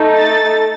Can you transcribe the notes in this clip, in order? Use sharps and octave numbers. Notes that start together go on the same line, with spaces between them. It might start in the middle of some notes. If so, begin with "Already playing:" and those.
Already playing: A3 D#4 A4
A6